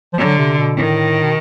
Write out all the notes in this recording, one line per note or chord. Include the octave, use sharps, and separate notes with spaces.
F3
D3 F#3
C3
B2
A2 D#3
B2